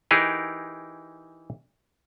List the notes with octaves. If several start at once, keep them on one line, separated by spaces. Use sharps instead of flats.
E3 D#4 G4 G#4 A#4